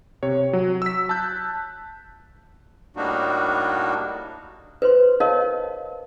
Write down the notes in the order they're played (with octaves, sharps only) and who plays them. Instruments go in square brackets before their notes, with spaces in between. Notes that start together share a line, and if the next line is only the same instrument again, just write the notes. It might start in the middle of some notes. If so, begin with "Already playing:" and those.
[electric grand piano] C3 C#5
F#3
E6 B6
A5 E6 F#6 G6
[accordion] A2 G3 A#3 D4 D#4 F#4
[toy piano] B4 C5 C6
A#4 B4 C#5 D#5 F5 A5